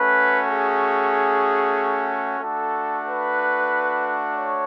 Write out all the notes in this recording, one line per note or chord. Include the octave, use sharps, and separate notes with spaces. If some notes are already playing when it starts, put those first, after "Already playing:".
Already playing: A3 C#4 F#4 B4
G#4
A3 D4 F#4 A4
B4
C#5